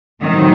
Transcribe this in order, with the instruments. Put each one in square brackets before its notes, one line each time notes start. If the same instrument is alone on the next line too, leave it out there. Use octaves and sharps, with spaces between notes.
[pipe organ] A2 F#3 C4 D#4 [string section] C3 D#3